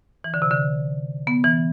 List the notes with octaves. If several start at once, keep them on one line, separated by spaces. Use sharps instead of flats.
E3
D3
C3
D3
B3
E3